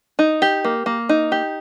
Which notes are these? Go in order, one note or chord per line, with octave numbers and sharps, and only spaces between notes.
D#4
G4
A#3
A#3
D#4
G4